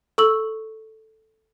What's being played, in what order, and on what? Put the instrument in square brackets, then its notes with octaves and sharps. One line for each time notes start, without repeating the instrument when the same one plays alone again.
[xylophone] A4 C#6 E6 F#7